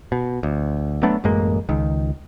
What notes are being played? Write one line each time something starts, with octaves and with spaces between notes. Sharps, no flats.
B2
D2
F#3 A3 B3 D4
A1 F#2 G#3 A#3
C#2 D#3